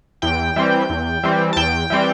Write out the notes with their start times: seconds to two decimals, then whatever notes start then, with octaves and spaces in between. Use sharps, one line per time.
0.22 E2 G5
0.56 E3 G3 C4
0.90 E2
1.23 E3 G3 C4
1.53 A5
1.57 E2 G5
1.90 E3 G3 C4